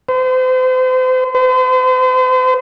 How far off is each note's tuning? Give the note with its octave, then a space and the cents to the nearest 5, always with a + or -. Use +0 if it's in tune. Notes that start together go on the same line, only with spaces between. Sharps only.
C5 -35
C5 -40